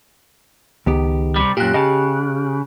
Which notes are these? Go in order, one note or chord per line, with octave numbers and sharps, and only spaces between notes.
C#2 D#3 B3 G4
C3 G3
F#2 A#2 G4 F#6
C#3 D#5 G5 A5